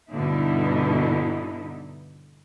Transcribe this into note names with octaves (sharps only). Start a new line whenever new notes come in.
G2 B2 D3 D#4 E4